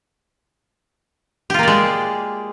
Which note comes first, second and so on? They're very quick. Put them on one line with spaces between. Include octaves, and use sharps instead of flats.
G4 F4 A#3 D5 G#3